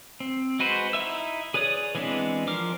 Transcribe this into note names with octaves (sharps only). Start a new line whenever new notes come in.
C4
G#3 F#4 B4 C5
D#4 E4 E5 E6
G#4 B4 C#5 D5 D#6
E3 G#3 B3 C4 D4
F3 A#4 C5 D6 F6